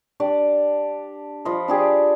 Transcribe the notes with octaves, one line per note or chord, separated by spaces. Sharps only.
D4 G4 D5
F3 F4 D#5 B5
D4 G4 G#4 D5